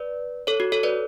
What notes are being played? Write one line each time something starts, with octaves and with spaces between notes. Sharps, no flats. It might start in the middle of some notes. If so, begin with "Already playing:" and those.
Already playing: B4 D5
A4 C#5
F#4
A4 C#5
B4 D5